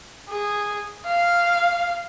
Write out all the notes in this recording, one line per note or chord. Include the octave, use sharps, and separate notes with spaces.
G#4
F5